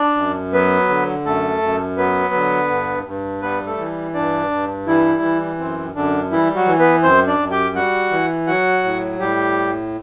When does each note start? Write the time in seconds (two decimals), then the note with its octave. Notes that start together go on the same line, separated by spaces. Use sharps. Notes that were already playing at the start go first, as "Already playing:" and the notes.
Already playing: D4 D5
0.17 F#2
0.53 F#3 B3 B4
0.89 D3
1.25 F#2 A3 A4
1.62 F#2
1.97 F#3 B3 B4
2.34 D3
2.70 G2
3.06 G2
3.42 G3 B3 B4
3.66 A3 A4
3.78 E3
4.14 G2 D4 D5
4.51 G2
4.87 E3 G3 E4
5.22 E3
5.59 F#2 C4
5.95 F#2 D3 D4
6.31 E3 G3 E4
6.55 F#3 F#4
6.67 E3
6.79 B3 B4
7.03 F#2 C4 C5
7.27 D4 D5
7.39 F#2
7.51 G4 G5
7.75 G3 F#4 F#5
8.11 E3
8.47 F#3 F#4 F#5
8.84 A2
9.20 A2 G3 G4